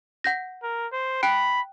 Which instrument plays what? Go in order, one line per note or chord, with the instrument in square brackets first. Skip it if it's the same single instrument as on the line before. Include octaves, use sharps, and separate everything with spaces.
[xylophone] F#5 G6 A#6
[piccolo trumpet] A#4
C5
[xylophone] G5 F#6 D7 [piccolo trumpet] B5